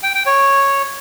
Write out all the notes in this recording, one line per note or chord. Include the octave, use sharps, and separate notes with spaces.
G5
G5
C#5